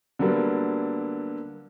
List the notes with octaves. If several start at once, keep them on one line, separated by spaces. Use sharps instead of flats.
D3 F#3 G3 A#3 B3